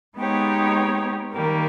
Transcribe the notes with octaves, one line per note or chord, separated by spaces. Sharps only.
G#3 B3 D#4 G4 C#5
D#3 G3 A#3